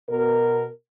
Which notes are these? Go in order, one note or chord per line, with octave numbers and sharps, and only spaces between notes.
B2 A#4